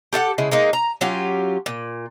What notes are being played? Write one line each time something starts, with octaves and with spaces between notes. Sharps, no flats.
G4 A4 E5 F#5
C#3 G#3 E4
G#3 A#3 D#4
A#5
F#3 C#4 F4 G4
A#2